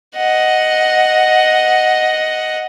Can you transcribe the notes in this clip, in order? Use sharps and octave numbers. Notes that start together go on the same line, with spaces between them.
D#5 F#5